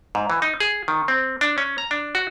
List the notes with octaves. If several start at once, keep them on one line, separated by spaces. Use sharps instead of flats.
G#2
E3
D#4
G#4
D#3
C4
D4
C#4
A#5
D4
F#4